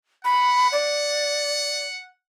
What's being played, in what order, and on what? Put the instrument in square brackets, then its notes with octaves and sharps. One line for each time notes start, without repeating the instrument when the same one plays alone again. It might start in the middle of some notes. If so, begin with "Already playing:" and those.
[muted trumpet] F#5 [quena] B5
[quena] D5